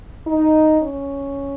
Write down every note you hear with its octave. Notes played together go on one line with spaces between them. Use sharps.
D#4
C#4